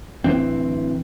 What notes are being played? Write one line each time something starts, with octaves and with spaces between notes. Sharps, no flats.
D1 B1 E3 C4